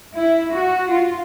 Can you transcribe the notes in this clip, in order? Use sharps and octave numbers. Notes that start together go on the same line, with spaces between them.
E4
F#4
F4